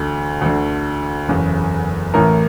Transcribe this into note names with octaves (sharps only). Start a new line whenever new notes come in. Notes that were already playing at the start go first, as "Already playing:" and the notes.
Already playing: D2 D3
D2 D3
F#1 E2 C#3
A1 A2 E3 A#4